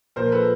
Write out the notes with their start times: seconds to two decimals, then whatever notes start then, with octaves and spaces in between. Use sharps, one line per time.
0.16 A#2 F3 A#4 C5
0.32 A4 B4